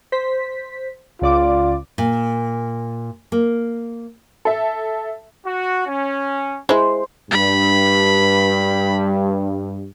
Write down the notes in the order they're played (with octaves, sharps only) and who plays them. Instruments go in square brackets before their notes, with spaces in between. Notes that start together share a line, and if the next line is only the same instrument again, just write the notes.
[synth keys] C5 B6
[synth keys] C#2 D5 D6 [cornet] F4
[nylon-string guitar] A#2
A#3
[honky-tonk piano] A4 E5
[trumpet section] F#4
C#4
[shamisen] G#3 E4 [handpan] C5
[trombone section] G2 [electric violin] B5